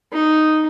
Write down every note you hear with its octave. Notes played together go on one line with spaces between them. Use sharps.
D#4